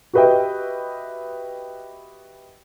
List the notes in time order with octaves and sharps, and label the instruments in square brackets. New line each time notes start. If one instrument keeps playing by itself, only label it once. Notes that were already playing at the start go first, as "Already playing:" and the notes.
[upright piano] F#4 G4 B4 D#5 E5 G5